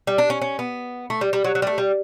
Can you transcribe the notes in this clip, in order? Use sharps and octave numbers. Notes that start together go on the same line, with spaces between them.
G3
D4
C#4
C#4
B3
A3
G3
G3
F#3
F#3
G3
A3
G3